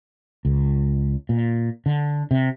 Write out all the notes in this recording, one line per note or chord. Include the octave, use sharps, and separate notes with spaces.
C#2
A#2
D3
C3